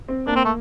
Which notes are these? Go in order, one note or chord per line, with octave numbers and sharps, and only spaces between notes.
C4
A#3 D4
C4
A3